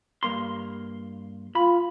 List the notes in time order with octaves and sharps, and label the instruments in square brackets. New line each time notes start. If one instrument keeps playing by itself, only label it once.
[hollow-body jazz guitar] G2 A#3 C6
[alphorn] F4 [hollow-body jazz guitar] B5